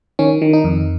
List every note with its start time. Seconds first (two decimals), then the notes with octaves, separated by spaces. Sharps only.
0.19 D#3 C#4
0.42 D#3
0.53 D#4
0.64 F2